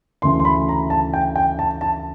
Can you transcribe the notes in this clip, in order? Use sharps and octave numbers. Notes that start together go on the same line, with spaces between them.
D2 C#3 E3 C6
C6
B5
A#5
A5
G5
G5
A5
A5